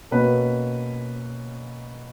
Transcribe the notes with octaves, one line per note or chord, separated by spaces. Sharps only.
B2 A#3 C#4 B4